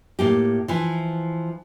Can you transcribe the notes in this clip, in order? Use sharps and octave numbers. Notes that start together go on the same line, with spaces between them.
A2 A#3 G4
E3 F3